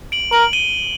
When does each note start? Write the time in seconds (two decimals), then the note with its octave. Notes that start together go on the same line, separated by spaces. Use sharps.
0.12 D7 F#7
0.32 A#4 D7 F#7
0.53 D#7 G7